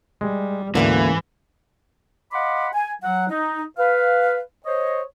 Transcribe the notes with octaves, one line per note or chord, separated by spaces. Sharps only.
G3 G#3
D2 G#2 D3 E3 A#3 C#4 E4
D#5 F5 F#5 B5 C6 D6
G#5
F#3 F#5
D#4
B4 F5
C5 C#5 D#5